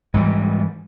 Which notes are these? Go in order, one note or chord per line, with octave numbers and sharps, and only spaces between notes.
G#2 E3 G3